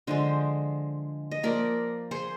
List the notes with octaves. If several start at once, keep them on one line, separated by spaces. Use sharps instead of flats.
D3 F3 G#3 C5 D#5
D#5
F3 A#3 A#4 D5
G#4 C5